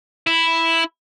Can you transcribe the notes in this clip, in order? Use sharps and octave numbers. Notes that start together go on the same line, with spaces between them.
E4